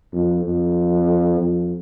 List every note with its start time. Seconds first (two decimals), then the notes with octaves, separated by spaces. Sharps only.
0.12 F2
0.44 F2
1.39 F2